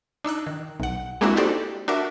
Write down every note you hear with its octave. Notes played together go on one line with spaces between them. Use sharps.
D4 D#4 E6 F#6
D#3
B1 F#5
G#3 A#3 C4 D4 E4 F#4
D#4 F#4 G4 A4 C5 D5
D4 F#4 A#4 E5